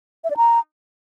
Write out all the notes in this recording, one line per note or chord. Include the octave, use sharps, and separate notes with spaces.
E5
D5
A#5